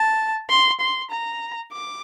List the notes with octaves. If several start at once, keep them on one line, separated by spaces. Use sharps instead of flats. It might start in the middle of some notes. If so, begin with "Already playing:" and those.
Already playing: A5
C6
C6
A#5
D6